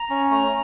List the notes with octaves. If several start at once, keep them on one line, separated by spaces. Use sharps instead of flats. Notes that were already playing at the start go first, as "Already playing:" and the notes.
Already playing: A#5
C#4
A3